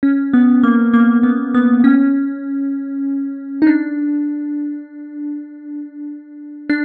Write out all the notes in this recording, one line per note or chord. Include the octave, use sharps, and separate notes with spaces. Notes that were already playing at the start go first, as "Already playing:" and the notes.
C#4
B3
A#3
A#3
B3
B3
C#4
D#4
D4
D4